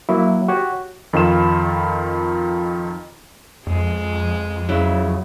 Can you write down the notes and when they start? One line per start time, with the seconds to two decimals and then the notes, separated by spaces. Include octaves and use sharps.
0.09 F#3 A#3 E4
0.48 F#4 G4 C#5
1.13 F2 D#3 F4 B5 E7
3.67 F2 G#3
4.69 F2 C#3 F#3 E4